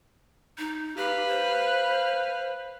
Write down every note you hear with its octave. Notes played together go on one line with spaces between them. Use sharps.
D#4
G4 B4 F5
C5